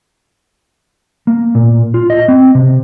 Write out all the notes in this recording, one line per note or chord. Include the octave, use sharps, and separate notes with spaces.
A#3
A#2
F4
D#5
C4
C3